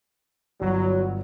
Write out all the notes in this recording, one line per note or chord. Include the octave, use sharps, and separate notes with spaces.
G1 F#3